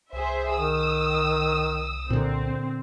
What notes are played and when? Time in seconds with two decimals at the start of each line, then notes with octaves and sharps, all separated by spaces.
0.13 C2 G#4 C5 E5
0.55 D#3 D#6 E6
2.10 A#2 D3 C4